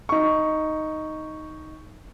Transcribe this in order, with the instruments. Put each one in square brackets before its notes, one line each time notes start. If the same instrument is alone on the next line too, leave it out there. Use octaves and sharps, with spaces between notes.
[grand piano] D#4 C#6